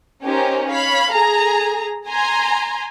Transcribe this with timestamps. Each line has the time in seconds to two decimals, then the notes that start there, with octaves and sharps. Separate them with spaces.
0.24 C#4 D#4 G4 A#4 C5
0.70 C#5 F5 B5
1.14 G#4 A4 A#5
2.09 G#5 A#5 C6